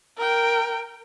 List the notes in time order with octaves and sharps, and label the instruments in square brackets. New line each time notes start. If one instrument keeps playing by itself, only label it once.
[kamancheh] A#4 G5